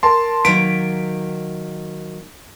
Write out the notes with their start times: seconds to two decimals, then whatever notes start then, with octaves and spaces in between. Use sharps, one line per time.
0.03 A#4 A5 C6
0.45 D#3 F#3 A#3 B6 D7